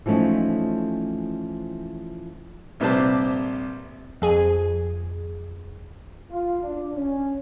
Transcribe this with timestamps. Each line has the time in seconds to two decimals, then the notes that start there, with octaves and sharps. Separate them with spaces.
0.06 E3 F3 A3 C#4 D#4
2.80 A#1 C3 G3 B4 C5 A5
4.22 F2 G#4
6.31 F4
6.63 D4
6.96 C#4